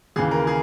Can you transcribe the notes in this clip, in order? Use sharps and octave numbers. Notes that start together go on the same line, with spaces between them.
D#2 C#3 E3 G#4
A#4
G#4